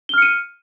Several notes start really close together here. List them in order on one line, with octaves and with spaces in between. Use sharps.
G7 F6 C#7 D#7